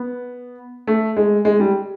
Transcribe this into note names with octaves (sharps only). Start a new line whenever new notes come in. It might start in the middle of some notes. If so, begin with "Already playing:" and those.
Already playing: B3
A3
G#3
G#3
G3